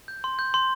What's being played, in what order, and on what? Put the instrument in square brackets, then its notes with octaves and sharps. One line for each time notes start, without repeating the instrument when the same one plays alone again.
[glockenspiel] G6
C6
G6
C6